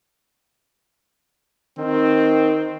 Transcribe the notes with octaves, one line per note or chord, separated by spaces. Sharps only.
D#3 C4